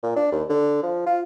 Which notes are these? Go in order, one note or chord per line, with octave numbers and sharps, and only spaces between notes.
A#2
D4
D#2
D3
F3
F4